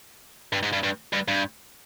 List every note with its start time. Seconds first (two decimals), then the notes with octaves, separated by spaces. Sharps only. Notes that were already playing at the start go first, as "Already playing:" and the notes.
0.53 G2
0.63 G#2
0.73 G2
0.83 G2
1.13 G2
1.28 G2